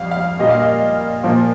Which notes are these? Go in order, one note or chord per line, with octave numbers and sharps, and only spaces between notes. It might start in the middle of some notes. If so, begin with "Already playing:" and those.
Already playing: F2 G3 F5
F5
A#2 G3 A#3 D#5
F5
D#5
A#2 F3 A#3